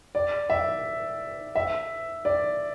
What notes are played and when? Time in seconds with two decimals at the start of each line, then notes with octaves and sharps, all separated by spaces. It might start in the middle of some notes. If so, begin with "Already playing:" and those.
0.15 D5
0.50 E5
1.55 E5
2.25 D5